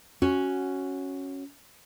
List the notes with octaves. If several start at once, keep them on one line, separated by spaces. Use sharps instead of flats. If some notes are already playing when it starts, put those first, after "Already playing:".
C#4 F#4